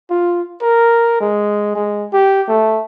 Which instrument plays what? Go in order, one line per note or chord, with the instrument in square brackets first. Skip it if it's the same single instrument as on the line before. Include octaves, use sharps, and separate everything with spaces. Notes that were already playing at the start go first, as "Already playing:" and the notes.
[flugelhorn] F4
A#4
G#3
G#3
G4
A3